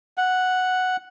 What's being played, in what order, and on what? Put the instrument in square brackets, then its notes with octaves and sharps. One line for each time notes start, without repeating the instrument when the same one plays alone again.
[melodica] F#5